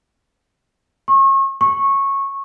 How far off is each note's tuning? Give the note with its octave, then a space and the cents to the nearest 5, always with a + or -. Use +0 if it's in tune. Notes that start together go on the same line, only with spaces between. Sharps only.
C#6 -35
C#6 -15